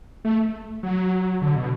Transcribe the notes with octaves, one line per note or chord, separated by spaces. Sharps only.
A3
F#3
D3
B2